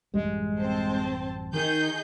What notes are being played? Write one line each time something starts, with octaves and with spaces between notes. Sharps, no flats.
A1 F#2 G3 G#3
C4 C5 A5
D#3 D#4 G#4 G6